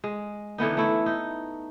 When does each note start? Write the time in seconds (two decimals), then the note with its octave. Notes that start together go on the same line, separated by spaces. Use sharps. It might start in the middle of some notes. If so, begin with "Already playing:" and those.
0.04 G#3
0.58 D3 E3 B3 D#4
0.77 A3 E4
1.06 D#4